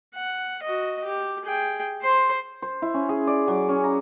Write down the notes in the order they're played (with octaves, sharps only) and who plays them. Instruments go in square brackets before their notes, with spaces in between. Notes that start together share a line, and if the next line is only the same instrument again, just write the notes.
[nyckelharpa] F#5
F#4 D#5
G4
G#4 G5
C5 C6
[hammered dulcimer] C5
E4
C#4
G#4
D5
F#3
C#4
A#5